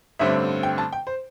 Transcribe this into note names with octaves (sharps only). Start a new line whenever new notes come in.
A1 G2 D3 A3 C4 E5
G5
A5
G5
C5